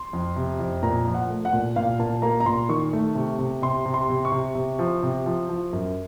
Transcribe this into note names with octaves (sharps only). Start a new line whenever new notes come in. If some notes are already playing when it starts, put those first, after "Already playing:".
Already playing: C6
F2
C3
F2
A#2 A#5
F3
F#5
A3
F#5
A#2
A#2 F5
A#2 A5
A#3 A#5
A#5
A#2 C6
D#3 C#6
A3
C3
C3
C3 C6
C3
C6
C3
C#6
C3
C3
F3
C3
F3
F3
F#2